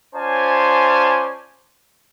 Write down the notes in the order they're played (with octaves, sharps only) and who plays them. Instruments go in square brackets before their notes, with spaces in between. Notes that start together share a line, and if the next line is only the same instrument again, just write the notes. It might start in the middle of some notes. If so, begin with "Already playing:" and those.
[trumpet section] C#4 F4 C5 D5 G#5 A5